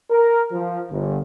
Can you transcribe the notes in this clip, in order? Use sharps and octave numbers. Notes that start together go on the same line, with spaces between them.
A#4
F3
G1